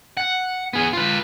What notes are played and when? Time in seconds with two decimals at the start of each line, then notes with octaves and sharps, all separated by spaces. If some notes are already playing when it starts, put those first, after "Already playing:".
0.17 F#5
0.73 B3 G#4
0.93 F4 B4